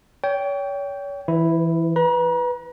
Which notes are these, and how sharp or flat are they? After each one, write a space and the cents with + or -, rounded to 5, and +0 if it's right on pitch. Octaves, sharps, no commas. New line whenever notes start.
C#5 +35 G5 +0
E3 +0 E4 +0 B4 +45
B4 +0 A#5 +40